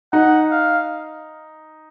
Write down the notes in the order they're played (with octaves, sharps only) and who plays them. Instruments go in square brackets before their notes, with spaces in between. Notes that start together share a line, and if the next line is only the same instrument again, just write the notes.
[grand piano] D#4 [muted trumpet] F#5
[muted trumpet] F5